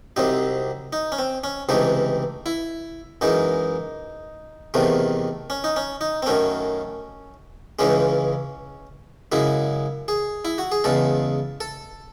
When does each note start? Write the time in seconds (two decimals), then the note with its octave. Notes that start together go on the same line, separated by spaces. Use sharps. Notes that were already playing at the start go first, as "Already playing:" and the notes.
0.16 C2 C3 F#3 D#4
0.93 D#4
1.12 C#4
1.18 C4
1.44 C#4
1.69 C#2 C3 E3 A3 D#4
2.46 E4
3.21 F#2 E3 G#3 D#4
4.74 E2 C3 D#3 A3
5.50 C#4
5.64 D#4
5.76 C#4
6.01 D#4
6.22 C4
6.26 F#2 D#3 A3 C#4
7.79 C#2 C#3 E3 G#3 C#4
9.32 F#2 C#3 G#3 E4
10.08 G#4
10.45 E4
10.58 F#4
10.72 G#4
10.84 E2 C#3 G#3 A4
11.61 A4